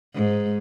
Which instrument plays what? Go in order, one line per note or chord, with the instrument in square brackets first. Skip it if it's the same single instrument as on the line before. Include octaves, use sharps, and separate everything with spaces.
[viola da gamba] G#2